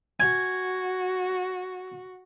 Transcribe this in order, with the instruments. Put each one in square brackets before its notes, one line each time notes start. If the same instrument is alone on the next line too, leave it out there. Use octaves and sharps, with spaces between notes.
[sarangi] F#4 [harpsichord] G#5